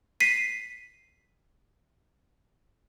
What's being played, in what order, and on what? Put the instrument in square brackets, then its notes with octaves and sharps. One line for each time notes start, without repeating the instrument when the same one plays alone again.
[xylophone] B6 C7 D#7